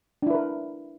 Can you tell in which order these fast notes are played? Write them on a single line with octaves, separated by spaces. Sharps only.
D4 E4 B4 A#4